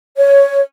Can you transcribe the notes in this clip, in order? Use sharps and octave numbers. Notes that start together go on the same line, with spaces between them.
C#5